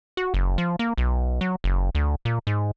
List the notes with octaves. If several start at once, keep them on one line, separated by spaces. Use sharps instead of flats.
F#4
F#1
F3
A#3
B1
F#3
F#1
D2
A#2
G#2